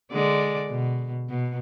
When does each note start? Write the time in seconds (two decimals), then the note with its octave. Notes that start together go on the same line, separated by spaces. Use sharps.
0.12 D3 G#3 D5
0.70 B2
1.30 B2